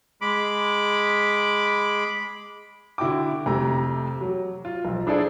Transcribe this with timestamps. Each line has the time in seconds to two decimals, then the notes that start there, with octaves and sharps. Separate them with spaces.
0.21 G#3 B5 D6
2.98 D3 E4 F#4 G5 D6
3.46 F2 C3 A3 A#5
4.21 F#3
4.65 F4
4.85 B1 F3
5.07 D4 E4 G#4 A4 C5 D5